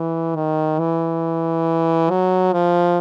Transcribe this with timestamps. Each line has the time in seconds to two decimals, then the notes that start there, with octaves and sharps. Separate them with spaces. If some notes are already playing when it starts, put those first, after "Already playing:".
Already playing: E3
0.36 D#3
0.79 E3
2.10 F#3
2.53 F3